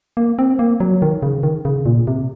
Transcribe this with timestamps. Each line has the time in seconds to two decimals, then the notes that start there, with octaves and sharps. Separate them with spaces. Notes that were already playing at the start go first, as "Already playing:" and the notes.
0.17 A#3
0.39 C4
0.59 A#3
0.80 F#3
1.02 D#3
1.22 C#3
1.43 D#3
1.65 C#3
1.86 A#2
2.07 C3